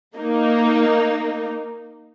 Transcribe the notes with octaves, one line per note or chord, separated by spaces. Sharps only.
A#3 D#4